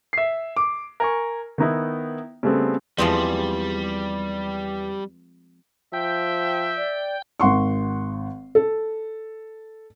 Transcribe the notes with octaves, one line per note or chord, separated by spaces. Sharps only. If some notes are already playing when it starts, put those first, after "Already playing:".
E5 C7
D6
A#4 G#5 C#6
D#3 B3 D#4 E4
C#3 G3 A3 B3 C4
E2 F3 G3 G#3 C4
F3 E5 G5
D5
G#1 F#5 C6 C#6
A4